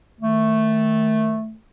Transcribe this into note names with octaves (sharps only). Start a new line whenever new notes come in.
D#3 A3